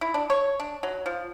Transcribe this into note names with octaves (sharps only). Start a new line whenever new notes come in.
E4
D4
C#5
D4
F#3
F3